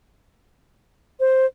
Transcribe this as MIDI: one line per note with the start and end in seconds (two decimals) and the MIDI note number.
1.20 1.46 72